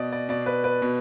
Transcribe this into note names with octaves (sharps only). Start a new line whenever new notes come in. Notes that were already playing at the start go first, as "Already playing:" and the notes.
Already playing: B2 D5 D#5
D5
B2 D5
B4
B4
B2